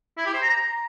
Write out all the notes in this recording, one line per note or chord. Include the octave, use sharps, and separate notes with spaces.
E4
G4
C5
A#5